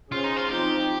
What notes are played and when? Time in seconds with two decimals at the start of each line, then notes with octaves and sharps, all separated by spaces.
0.11 C#4 F4 G#4 C5
0.24 D#4
0.36 F4
0.49 F3 C4 D#4 G4